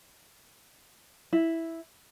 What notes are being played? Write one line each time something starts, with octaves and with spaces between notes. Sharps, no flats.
E4